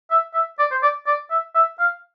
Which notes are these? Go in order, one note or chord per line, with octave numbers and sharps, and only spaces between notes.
E5
E5
D5
C5
D5
D5
E5
E5
F5